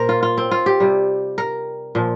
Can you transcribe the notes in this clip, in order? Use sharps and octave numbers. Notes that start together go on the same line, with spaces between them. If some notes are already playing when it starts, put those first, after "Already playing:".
Already playing: A#2 A#4 C5
F4
F4
C4
F4
G4
C3 G3
A#4
A#2 F3